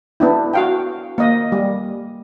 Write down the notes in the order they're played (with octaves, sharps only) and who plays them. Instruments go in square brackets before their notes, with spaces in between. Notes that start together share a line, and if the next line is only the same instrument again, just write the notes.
[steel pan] B3 D4 E4
F#4 F5 G5
A#3 D#5
G3